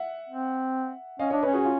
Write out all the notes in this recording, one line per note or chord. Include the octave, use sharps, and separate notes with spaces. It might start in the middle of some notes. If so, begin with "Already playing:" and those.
Already playing: E5 F#5
C4
C#4 D#5 F5
D4 C#5 D#5
C#4 B4 C#5
F#4 G#4
F4